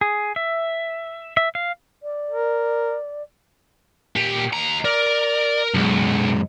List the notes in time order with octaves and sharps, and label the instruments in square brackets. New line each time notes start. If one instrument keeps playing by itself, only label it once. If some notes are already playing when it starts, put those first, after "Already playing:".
[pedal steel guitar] G#4
E5
E5
F5
[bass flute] D5
[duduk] A#4
[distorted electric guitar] A#2 G4
D#2 A#5
[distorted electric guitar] A#4 [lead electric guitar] D5
[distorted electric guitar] B1 [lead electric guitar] F#2 G#3